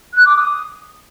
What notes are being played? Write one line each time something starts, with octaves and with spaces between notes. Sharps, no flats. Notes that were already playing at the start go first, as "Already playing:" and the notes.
F#6
D6
D#6